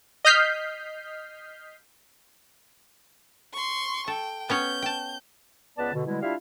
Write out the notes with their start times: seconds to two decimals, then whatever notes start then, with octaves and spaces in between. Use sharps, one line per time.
0.25 D#5 D#6 F6 G6 B6 C7
3.53 C6 C#6
4.08 A4 G5
4.50 B3 C#4 C#5 G6
4.82 G5 A5
5.77 C#2 B3 B4 D5 A5
5.93 B2 D3
6.06 B2 D3 G3 G#3 E4
6.22 G3 D4 E4 F4 E5 F5